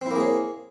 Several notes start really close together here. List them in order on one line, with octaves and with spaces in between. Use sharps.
C4 E4 A#3 G#4 C#5